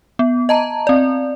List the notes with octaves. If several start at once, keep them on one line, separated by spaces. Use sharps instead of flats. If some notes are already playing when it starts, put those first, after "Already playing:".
B3
D#5 A5 A#5
C4 D5